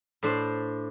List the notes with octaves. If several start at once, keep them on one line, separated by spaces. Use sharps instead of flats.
A2 D4 C5